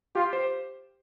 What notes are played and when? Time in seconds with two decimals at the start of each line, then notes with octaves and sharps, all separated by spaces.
0.15 F4 G4
0.33 C5